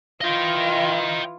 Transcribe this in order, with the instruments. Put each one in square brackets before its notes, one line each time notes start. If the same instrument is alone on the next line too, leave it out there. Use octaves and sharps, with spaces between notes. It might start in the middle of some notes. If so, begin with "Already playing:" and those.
[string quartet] E3 F4 [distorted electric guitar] D#5 G5